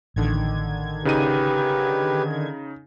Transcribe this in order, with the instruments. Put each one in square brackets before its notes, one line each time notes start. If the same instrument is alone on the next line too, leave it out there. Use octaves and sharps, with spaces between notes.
[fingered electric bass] A1 [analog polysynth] D3 D#3 G#6
[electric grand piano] C#3 D#4 D#7 [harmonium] G4 B4